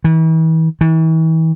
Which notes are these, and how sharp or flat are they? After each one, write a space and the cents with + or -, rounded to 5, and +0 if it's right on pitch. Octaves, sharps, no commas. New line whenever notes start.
E3 -40
E3 -40